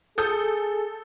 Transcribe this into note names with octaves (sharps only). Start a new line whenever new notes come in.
G#4 A4 D#6 G6